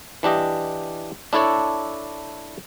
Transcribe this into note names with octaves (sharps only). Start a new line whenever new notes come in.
E3 D4 G4 D#5
D4 E4 A4 C#5 D5